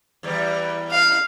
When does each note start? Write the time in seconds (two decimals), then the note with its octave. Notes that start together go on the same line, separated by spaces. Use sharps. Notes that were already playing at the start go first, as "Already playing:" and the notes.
0.23 E2 G3
0.91 F5